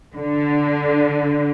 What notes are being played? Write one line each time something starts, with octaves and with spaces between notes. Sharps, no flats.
D3